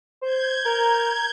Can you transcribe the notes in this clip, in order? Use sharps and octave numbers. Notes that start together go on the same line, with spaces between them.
C5 G6 G#6
A#4 A#5